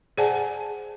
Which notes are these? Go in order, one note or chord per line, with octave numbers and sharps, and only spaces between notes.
G#4 C5 D5 F#5 G#5 A5